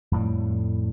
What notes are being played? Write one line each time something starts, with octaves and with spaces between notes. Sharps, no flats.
F2 A2 G3